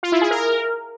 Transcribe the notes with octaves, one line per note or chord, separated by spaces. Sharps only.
F4
E4
G#4
A#4